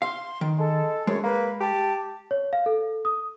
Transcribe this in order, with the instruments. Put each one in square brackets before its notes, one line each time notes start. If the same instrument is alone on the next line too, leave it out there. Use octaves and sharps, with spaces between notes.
[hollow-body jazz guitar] F5 [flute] C6
[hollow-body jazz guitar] D#3
[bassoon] G#3 [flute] A4
[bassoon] F#2 [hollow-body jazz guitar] G#3 [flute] C#5
[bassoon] A#3 [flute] B4
[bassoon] G4 [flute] A5
[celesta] C#5
F5
A4
D#6